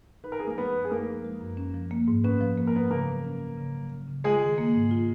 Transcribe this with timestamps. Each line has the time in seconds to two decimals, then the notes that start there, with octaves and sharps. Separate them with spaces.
0.24 D#4 B4
0.32 A#4
0.39 F3 G#4
0.47 A#3 A#4
0.58 G#3 B3 B4
0.75 F#2
0.85 G#4
0.91 A#3 D#4 A#4
1.08 F3
1.25 G#3
1.41 F#2
1.57 C#4
1.74 F3
1.91 A#3
2.08 G#2
2.24 B3 C#4 B4
2.41 F3
2.58 A#3 B4
2.67 A#4
2.75 G#2 B3 B4
2.91 C#3 A#3 A#4
3.08 F#3
3.25 C#4
3.41 C#3
3.58 C#3
3.75 F#3
3.92 C#4
4.08 C#3
4.24 G#3 F4 G#4
4.42 D#3
4.58 A#3
4.75 G#2
4.91 F4